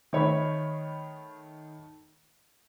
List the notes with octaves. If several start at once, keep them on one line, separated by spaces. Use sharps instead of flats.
D#3 A3 C#5 D#5 B5